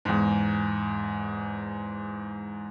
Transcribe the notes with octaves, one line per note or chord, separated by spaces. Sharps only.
E2 G#2